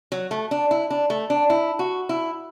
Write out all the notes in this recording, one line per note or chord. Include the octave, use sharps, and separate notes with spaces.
F#3
A3
D4
E4
D4
A3
D4
E4
F#4
E4